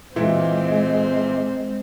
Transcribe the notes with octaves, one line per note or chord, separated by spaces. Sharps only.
A#2 E3 G#3 C4 E4